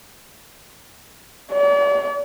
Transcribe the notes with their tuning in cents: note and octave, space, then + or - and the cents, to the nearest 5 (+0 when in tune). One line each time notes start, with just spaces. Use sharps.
D5 -45